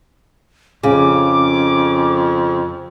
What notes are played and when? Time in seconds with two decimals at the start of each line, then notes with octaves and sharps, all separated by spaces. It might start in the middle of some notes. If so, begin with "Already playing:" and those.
0.83 F2 C#3 D6